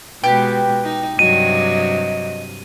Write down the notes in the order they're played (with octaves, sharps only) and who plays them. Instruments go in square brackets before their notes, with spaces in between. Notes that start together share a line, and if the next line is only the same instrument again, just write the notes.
[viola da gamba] B2 G#3 [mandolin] G4 [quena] B4
[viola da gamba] D#4
[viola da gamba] G2 C3 F#3 [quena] D#5 [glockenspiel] D#7